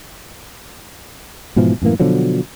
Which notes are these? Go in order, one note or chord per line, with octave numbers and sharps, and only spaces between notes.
G#2 B2 E3 F3
F#2 A2 E3 A#3
B2 D3 F3 F#3